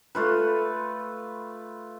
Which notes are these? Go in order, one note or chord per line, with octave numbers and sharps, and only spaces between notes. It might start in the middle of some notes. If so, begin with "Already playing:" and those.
A3 F4 B4